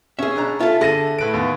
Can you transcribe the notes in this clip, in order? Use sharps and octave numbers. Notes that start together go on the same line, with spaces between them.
C#4 G#4 E5
B2 D4 A#5
F4 A4 E5 A5
D3 G#4 A4 A#6 D#7
A2 B4 D7
D#2 B3